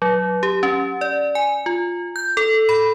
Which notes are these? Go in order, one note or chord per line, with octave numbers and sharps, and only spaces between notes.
F#3
G4
C#4
D5
G#5
F4
G6
A4
B5